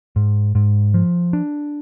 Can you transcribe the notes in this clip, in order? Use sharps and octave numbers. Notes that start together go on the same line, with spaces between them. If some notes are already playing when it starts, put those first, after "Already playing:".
G#2
G#2
F3
D4